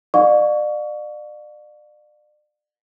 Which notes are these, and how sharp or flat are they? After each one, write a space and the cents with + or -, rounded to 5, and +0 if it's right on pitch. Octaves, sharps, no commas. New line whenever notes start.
D5 +35 F5 +35 C#6 +30